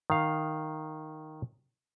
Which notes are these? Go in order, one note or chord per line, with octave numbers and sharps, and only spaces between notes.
D#3 F5